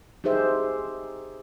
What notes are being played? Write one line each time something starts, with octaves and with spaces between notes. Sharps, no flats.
D#4 G4 G#4 C5 E5